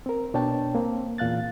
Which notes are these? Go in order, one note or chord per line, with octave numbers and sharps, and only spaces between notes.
C4 A#4
B2 D4 C#5 G5 A5
A#3 C4
E2 A#2 F5 F#6 A6